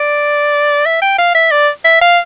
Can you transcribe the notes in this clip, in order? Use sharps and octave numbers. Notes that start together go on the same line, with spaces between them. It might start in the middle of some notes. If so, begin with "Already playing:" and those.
Already playing: D5
E5
G5
F5
E5
D5
E5
F5